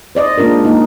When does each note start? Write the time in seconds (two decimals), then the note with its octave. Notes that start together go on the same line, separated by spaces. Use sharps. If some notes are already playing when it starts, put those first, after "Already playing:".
0.15 C5 D5 D#5
0.38 G#3 A#3 D4 F4 A#4
0.65 A#3 D#4